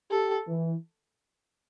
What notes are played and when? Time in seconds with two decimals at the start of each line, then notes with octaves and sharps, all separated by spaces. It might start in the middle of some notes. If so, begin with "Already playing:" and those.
0.10 G4 A4
0.48 E3